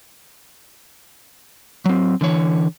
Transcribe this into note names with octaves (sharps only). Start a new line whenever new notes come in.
F#3 C4
D3 E3 C#5